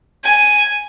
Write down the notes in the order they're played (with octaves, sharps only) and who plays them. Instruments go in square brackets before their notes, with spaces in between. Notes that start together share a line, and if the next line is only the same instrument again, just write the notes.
[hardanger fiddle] G#5